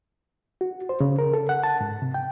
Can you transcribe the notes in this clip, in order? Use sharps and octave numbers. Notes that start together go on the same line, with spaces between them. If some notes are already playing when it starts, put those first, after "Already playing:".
F#4
C5
C#3
A#4
A4
F#5
A5
G#2
C3
G5